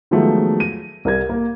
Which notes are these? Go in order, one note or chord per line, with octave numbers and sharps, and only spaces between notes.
D#3 F3 F#3 G#3 A3 B3
D#7
C2 A#4 G#6
A#3